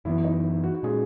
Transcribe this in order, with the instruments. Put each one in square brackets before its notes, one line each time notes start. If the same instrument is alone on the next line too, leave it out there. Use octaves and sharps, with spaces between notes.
[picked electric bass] F#2 E3 B3 [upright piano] E4
[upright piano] D#4
F#4
F#4
[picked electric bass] A#2 G#3 C#4 [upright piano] G#4